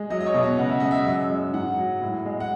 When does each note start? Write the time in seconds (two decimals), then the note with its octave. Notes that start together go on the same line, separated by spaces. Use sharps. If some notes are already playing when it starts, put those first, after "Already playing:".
Already playing: G#3
0.10 F#3 D#5
0.20 D#5
0.26 C#5
0.34 B2
0.43 D#5
0.58 C#3 F#5
0.69 E5
0.80 G#3 D#5
0.91 E5
1.06 F#2
1.30 G#3
1.54 G#2 F#5
1.78 F#3
2.01 A2
2.25 G#3
2.40 F#5